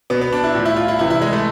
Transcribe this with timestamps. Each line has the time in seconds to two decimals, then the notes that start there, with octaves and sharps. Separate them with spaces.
0.10 B2 B3
0.21 B3
0.32 D4
0.44 E4
0.55 A2 F3
0.65 E4
0.76 F4
0.88 E4
0.99 C3 E3 E4
1.10 E4
1.21 G#3
1.33 A3